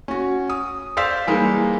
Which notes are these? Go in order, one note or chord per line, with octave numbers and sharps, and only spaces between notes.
C#4 F#4
D#6
C5 D5 F5 E6 B6
E3 G3 G#3 A#3 D#4